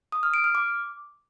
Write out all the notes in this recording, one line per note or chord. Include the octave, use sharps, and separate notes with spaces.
D#6
F6
D7
F6
D6